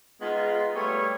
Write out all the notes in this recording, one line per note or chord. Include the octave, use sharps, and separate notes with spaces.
G#3 B3 D#4 F4
G3 A3 B3 C#5